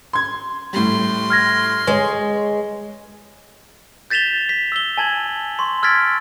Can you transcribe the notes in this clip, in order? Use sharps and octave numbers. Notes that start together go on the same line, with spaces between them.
C6 G#6
A2 G3 C6
F6 G#6 A#6
G#3 B4 C#5
G6 A6 B6 E7 F7 G7
B6
E6 G7
G#5 A5 G#6 F#7
C6 C#6
E6 F6 G#6 A6 B6 D7